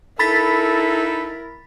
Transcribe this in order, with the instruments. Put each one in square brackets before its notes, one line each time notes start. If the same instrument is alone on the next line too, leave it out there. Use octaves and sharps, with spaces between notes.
[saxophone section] D#4 A4 [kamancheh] E4 A#4 [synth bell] B5 A6 B6